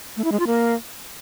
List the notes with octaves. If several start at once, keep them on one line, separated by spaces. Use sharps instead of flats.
A3
E4
G#3
F4
A#3